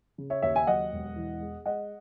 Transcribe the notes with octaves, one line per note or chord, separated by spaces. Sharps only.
C#3
C#5 E5
D#2 C#5 E5
E5 G#5
F#3 D#5 F#5
E1
E3
G#3
G#3 D#5 F#5